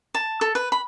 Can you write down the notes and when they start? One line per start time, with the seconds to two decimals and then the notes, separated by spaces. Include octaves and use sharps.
0.15 A5
0.41 A4
0.55 B4
0.72 B5